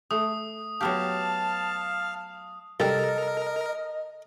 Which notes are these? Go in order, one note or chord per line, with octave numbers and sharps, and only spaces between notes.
A3 D#6
F#3 B3 G4 F5 A5
C2 G3 A4 A#4 D#5